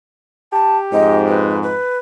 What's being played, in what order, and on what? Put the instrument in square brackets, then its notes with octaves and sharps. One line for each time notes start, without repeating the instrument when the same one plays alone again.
[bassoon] G4 [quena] A5
[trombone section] F2 G#2 [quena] D#5
[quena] B4
B4